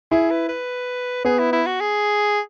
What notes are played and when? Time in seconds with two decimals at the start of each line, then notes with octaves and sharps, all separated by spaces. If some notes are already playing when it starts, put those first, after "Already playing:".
0.11 E4 G#4
0.31 B4
0.49 B4
1.25 B3 G#4
1.39 E4
1.53 E4
1.66 F#4
1.81 G#4